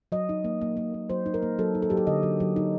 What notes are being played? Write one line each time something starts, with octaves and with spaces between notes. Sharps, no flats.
F#3 D#5
D#4
A#3
A#3
A#3
A#3
F#3 C5
D#4
A#4
A#3
F#3 A4
D#4
A4
F#3 G4
A4
D3 D#5
F#3
F#3
D#4